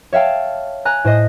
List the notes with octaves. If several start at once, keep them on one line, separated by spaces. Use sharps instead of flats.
C#5 E5 F5 G5 A5
G#5 A#5 F#6
A2 C5 D#5 D#6